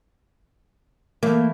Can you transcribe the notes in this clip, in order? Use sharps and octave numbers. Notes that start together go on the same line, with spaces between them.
E3 A3 A#3